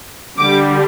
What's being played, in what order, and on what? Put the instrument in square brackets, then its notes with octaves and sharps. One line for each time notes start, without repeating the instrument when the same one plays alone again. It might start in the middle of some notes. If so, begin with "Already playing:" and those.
[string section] D3 G3 D6